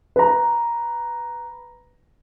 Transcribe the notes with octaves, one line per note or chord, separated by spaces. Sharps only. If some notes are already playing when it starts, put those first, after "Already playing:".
B4 A#5